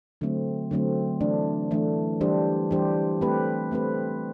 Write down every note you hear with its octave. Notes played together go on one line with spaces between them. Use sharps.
D3 F#3 A3 C4
D3 F#3 A3 C4
E3 A3 D4
E3 A3 D4
E3 G3 D4 G4 C5
E3 G3 D4 G4 C5
A3 C4 G4 B4
A3 C4 G4 B4